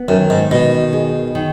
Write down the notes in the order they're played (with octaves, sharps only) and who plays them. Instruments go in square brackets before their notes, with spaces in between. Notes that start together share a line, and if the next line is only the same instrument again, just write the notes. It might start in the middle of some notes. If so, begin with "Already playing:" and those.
Already playing: [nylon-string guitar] B3
[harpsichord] F#2 [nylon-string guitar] D#3
[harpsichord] G#2
[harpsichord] B2 [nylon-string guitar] D#5
[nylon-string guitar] G#4
D#3